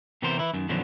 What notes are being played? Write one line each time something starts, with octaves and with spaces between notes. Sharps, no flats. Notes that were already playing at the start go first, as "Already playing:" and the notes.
C3 E3 B3 C4 A#4 C5
E3 E4
F#2 D#3
F#2 B2 D3 D#3 F3 F#3